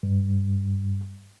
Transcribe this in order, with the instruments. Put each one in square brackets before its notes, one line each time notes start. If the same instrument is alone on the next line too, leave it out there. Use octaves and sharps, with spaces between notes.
[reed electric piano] G2